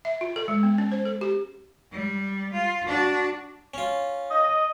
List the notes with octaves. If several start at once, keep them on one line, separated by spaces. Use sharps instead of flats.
E5
F4
A4
G#3
B3
C#4
C5
A4
G4
G3
F4
D4 F#4
C#4 F4
D#5